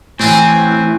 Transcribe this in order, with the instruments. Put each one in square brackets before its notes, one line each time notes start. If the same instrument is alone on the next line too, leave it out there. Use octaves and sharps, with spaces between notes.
[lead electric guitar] A2 E3 [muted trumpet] C4 [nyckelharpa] G#5
[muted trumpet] C4